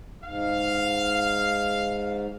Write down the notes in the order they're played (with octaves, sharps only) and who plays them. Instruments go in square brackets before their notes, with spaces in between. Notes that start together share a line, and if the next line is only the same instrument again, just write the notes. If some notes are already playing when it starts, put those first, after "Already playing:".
[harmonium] G#2 [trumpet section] F5